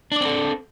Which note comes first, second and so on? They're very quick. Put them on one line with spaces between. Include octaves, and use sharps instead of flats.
D4 D5 C4 A4